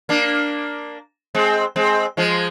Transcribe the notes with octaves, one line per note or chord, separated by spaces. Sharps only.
A#3 D4
G#3 C4
G#3 C4
F3 G#3